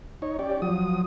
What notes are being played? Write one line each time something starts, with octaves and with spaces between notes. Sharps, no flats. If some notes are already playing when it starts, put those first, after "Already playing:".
D#4 C#5
C#4 G4 D5
F3 F#3 D#6